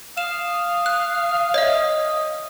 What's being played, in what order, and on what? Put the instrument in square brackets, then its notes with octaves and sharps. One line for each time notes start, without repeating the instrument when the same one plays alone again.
[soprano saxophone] F5 [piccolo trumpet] D#6 [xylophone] E7
[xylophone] F#6
[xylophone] C#5 E5 [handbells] D#5